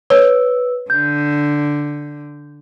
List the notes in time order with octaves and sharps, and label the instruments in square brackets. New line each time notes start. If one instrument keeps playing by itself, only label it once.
[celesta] B4 E6 [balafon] C#5
[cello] D3 [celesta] G6